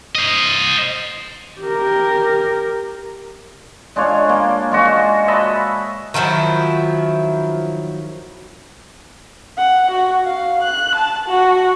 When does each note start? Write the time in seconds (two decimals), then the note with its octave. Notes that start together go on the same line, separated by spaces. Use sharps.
0.15 C5 D#5
1.61 G4 A#4
3.96 G#3 D4 F4 C#5
4.29 A#3
4.72 G#3 F4 F#4
5.28 D#5 E5 A5 B5
6.14 D#3 F3 F#3 E4
9.58 F#5
9.91 F#4
10.25 F5
10.63 F#6
10.96 A5
11.29 F#4